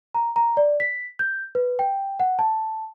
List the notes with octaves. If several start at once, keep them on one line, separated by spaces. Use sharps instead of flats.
A#5
A#5
D5
B6
G6
B4
G5
F#5
A5